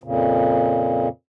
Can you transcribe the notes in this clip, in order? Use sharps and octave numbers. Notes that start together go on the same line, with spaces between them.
F2 A#2 C#3